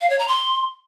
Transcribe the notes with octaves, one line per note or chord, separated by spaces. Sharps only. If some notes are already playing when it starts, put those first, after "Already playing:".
F5
C#5
A#5
C6